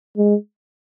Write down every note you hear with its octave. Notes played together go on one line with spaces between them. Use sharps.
G#3